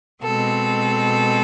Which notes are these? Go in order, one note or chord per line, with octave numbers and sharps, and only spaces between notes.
B2 G#3 C4 A4